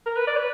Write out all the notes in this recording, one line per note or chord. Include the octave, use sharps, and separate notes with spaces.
A#4
B4
D5
B4